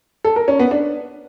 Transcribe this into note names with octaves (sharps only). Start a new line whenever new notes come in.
A4
A#4
C#4
B3
D4